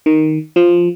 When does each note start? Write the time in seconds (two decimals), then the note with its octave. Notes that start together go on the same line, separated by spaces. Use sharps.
0.06 D#3
0.56 F3